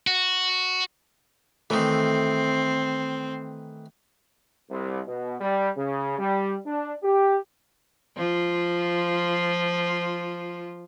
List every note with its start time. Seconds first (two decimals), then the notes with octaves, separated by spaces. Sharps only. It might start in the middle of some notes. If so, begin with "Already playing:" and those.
0.07 F#4
1.70 D#3 E3 A3 C4
4.70 C2
5.07 B2
5.40 G3
5.77 C#3
6.19 G3
6.66 D4
7.03 G4
8.16 F3 F4